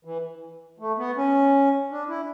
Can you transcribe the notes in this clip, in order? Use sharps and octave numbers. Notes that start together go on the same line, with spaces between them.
E3
A3
B3
C#4
D4
E4